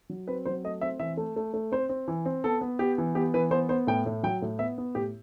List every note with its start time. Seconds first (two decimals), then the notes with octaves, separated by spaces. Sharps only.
0.10 F#3
0.28 C4 B4
0.45 F#3 C5
0.64 A3 D#5
0.81 C4 E5
0.99 E3 E5
1.17 A3
1.36 A3
1.54 A3
1.72 C4 C5
1.89 C4
2.08 E3
2.26 C4
2.44 B3 A4
2.61 B3
2.79 B3 G4
2.98 E3
3.15 B3 G4
3.34 E3 B4
3.51 B3 C5
3.69 B3 C5
3.87 A2 G5
4.06 A2
4.23 F#3 G5
4.42 A2
4.59 B3 E5
4.78 B3
4.95 A2 G4